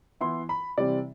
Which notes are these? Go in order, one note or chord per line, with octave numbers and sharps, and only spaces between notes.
E3 B3 E4 C6
B5
C3 E3 G3 C4 D5